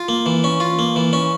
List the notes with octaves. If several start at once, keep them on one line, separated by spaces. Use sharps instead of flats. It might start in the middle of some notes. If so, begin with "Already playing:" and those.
Already playing: F4
A#3
E3
C#4
F4
A#3
E3
C#4